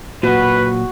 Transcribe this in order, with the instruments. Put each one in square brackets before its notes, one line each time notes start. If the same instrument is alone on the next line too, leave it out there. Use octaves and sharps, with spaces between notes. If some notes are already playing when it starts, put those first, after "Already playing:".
[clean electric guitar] A#2 F#3 [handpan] A#3 F#4 [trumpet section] B4